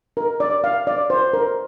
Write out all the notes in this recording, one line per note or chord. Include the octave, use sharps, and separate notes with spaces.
A#4
D5
F5
D5
C5
A#4